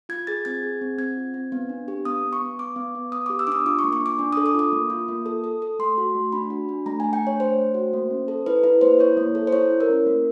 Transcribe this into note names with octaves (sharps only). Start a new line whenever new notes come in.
F4 G#6
G#4 A6
C4 G#6
G#4
C4
C4 G#6
F4
C4
B3
D4
G4
B3 D#6
B3
C#6
B3
B3 D6
B3
B3
B3 D#6
G4 D6
E6
D4 D6 D#6
F4 D6
C#6
A#3
C#6
D4
D6
D4
A4 D#6
D6
F4 D#6
A#3
F4
A#3
A4
A4
A4
A3 C6
F#4
A3
D4 B5
F#4
D4
A3 A#5
A3 G#5
G5
D4
C#5
A3 C5
A3
F#4
A#3
C#4
A4
E4 B4
E4 B4
A#3 C5
E4 C#5
A#3
A4
C5
E4 C#5
E4
A#4
C#4
A#3